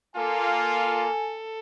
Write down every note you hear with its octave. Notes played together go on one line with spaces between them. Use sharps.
A#3 F4 A4 G#5